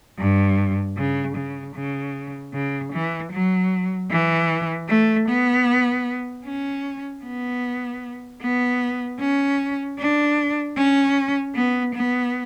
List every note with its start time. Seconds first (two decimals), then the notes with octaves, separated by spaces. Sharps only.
0.18 G2
0.97 C#3
1.36 C#3
1.76 C#3
2.54 C#3
2.93 E3
3.32 F#3
4.10 E3
4.89 A3
5.28 B3
6.45 C#4
7.24 B3
8.42 B3
9.20 C#4
9.99 D4
10.77 C#4
11.55 B3
11.95 B3